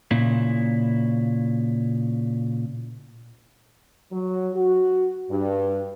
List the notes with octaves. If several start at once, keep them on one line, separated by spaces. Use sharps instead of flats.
A#2 C#3 E4
F#3
F#4
G2